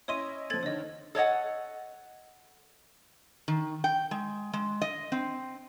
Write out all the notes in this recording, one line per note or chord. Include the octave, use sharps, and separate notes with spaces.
C#4 E4 C#5 D#5 C6 D#7
F3 C4 A4 G#6 A6
D3 D#3 C#5 D#5
A4 C#5 D#5 F#5
D#3
G5
G#3
G#3
D#5
C4